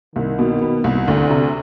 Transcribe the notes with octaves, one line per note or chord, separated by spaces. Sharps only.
C2 D#3
B2
B3
C2
D2 D3
C3